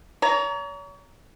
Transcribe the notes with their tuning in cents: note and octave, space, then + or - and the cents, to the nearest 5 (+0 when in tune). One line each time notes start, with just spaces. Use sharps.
C#5 +40 A#5 +0